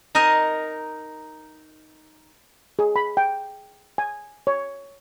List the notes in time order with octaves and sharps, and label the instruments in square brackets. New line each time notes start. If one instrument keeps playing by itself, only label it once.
[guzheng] D#4 A#4 D#5 G#5
[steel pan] G#4
B5
G5
G#5
C#5